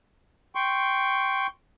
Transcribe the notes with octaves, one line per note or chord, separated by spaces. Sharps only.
G5 C6 C#6